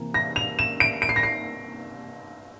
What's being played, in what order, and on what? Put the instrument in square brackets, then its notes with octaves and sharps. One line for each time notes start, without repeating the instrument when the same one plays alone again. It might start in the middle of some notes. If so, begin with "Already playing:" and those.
Already playing: [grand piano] C3 E3 A#3
[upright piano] A#6
F7
E7
D7
D7
C7
A#6
C7